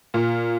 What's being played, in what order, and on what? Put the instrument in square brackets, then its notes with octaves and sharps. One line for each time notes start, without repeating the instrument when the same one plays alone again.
[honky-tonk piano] A#2